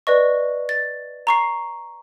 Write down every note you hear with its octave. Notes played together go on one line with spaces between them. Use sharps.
B4 D5 D#5 C#6
A6
A#5 C#6 C7